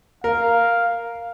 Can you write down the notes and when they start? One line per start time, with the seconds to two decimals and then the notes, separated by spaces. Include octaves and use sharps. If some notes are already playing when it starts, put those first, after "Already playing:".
0.24 A#4 F5